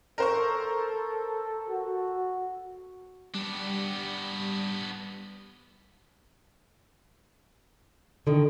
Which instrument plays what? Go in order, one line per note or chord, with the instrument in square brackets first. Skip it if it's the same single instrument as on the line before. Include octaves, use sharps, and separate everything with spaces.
[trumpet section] A4 [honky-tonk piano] A#4 C5 C#6
[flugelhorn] F#4
[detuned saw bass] G3 [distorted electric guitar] B3 D4
[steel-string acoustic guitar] D3 D#3 [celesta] A4